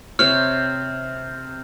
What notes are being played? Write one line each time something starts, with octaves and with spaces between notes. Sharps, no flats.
C3 C#5 F6